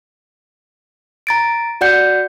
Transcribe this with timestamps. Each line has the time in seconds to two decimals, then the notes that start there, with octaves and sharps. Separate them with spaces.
1.27 A#5 A6 D7
1.81 F#4 D5 F#5 G6 C#7